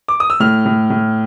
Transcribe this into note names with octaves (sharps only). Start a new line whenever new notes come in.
D6
D#6
E6
A2 F6
A2
A2